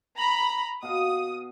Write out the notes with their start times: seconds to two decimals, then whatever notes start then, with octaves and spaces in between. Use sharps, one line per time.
0.17 A#5 B5
0.83 B2 F5 D#6